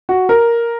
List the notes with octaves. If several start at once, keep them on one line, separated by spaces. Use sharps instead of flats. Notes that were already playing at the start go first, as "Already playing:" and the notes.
F#4
A#4